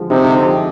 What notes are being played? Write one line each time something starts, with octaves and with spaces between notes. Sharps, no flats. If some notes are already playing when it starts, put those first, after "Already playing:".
Already playing: D3 F3 G#3
C3 D#4
D3
F3